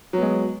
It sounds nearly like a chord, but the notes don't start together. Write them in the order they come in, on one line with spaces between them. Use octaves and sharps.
F#3 B3 G#3